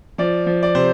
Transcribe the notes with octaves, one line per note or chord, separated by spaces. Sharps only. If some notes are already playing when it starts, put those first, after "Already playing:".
F3 D5
F3
D5
C3 C5